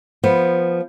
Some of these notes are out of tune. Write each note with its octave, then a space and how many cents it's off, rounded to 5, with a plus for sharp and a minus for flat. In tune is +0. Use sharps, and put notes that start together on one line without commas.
F3 +0 B3 -5